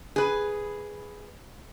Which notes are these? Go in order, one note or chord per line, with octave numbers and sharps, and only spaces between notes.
G#4 B4